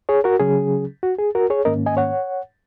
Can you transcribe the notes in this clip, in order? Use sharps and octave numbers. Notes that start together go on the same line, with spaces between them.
G#4 C#5
F#4 A#4
C#3 F#3 C#4 G#4
F#4
G#4
F#4 A#4
G#4 C#5
G#2 D#3 A#3 C#4 A#4 D#5
D#5 G#5
C#5 F#5